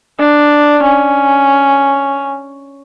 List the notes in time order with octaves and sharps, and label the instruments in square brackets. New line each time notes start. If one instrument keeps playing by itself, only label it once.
[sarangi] D4
C#4